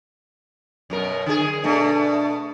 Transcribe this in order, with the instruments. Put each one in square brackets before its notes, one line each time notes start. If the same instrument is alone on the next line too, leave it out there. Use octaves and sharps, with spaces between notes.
[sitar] F#2 B2 A#4
D3 G#4
[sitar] B2 A3 [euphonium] D4